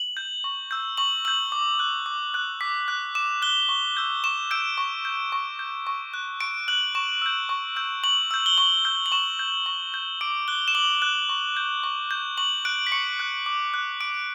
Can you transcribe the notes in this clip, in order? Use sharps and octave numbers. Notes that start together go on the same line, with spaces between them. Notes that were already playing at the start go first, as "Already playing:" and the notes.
Already playing: F#7
G6
C#6
E6 G6
C#6 F#7
E6 G6 F#7
D6
F#6
D6
F#6
D6 B6
F#6
D6 E7
F#6 G7
C#6
E6 G6
C#6 E7
E6 G6 D7
C#6
G6
C#6
G6
C#6
F#6
C#6 D7
F#6 F#7
C#6 E7
E6 G6
C#6
E6 G6
C#6 F#7
E6 G6
G7
C#6 F#7
E6 G6
F#7
C#6 E7
G6
C#6
G6
D6 D7
F#6 G7
E7
D6 F#7
F#6
C#6
G6
C#6
G6
C#6 F#7
F#6 D7
B6
C#6 C#7
F#6
D6
F#6
D6 D7